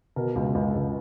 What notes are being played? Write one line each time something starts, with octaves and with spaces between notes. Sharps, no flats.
B2 A#4
C#2
C#2
C#2